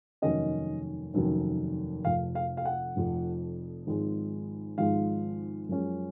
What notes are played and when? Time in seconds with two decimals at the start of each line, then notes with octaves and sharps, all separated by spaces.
0.22 F1 D#2 D#3 F#3 C#4 D#5
1.14 F1 D#2 D#3 F#3 C#4
2.05 F1 F2 F3 F5
2.35 F5
2.57 F5
2.65 F#5
2.96 F1 F2 F3
3.87 G#1 G#2 F3 G#3
4.78 G#1 G#2 F3 G#3 F5
5.69 F#2 F3 G#3 C#4